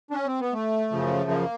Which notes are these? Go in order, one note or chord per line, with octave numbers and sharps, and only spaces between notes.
D4
C#4
C4
B3
A3
F#2 C#3 F3
A#3